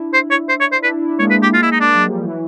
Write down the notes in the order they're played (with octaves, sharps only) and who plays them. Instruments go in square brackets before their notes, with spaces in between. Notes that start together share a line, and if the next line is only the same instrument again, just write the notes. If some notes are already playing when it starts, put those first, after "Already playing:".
Already playing: [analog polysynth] D4 E4
[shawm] C5
C#5
C5
C#5
C5
[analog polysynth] D4 E4 [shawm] B4
[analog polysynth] D4 E4
[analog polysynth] G#3 A#3 [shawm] C#5
[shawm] B4
G4
F4
E4
D#4
D4
[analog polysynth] F#3
F3 G3
E3 F#3